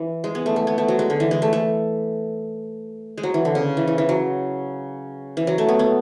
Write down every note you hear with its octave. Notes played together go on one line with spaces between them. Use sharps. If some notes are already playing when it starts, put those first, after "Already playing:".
Already playing: E3
G#3
B3
A3
A3
B3
A3
F#3
G#3
D3
E3
G#3
A3
A3
G#3
F#3
E3
D3
C#3
E3
E3
E3
F#3
E3
F#3
A3
B3
B3